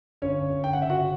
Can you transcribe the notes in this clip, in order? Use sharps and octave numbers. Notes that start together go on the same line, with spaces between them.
G1 C#4 C#5
G1
G5
F#5
C#3 E5
F#4 F#5